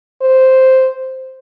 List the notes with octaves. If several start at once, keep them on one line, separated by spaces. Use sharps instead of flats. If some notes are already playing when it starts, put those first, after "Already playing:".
C5